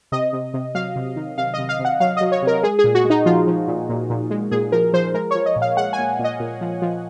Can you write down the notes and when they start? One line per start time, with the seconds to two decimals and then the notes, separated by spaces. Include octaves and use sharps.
0.12 C3 D#5
0.33 C3
0.54 C3
0.75 F#3 F5
0.96 C3
1.16 D#3
1.38 C3 F5
1.54 C3 D#5
1.69 F5
1.80 C3
1.85 F#5
2.00 F#3 F5
2.17 F#3 D#5
2.32 C#5
2.42 C3 A#4
2.63 G#3 G#4
2.79 G#4
2.84 A#2
2.95 F#4
3.05 G#3
3.10 D#4
3.26 F3 F4
3.47 F3
3.68 A#2
3.89 A#2
4.10 A#2
4.31 G#3
4.51 A#2 G#4
4.72 F3 A#4
4.93 F3 C5
5.14 G#3 A#4
5.31 F3 C#5
5.46 D#5
5.56 A#2
5.62 F5
5.77 G#3 F#5
5.93 G#5
5.99 A#2
6.19 A#2
6.24 D#5
6.40 A#2
6.61 F3
6.82 F3